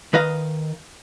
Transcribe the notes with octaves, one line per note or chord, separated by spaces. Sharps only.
D#3 B4 D#5 F5